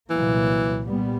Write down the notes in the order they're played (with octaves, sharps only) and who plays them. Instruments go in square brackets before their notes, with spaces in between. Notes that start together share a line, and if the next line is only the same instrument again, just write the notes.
[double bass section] C2 A#2 F#3 A#3 [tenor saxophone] E3
[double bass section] A#2 G3 B3